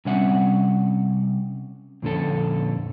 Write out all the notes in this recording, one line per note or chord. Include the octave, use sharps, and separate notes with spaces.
C3 G3 C#4 E5 F#5
F2 A#2 D3 C#4 A4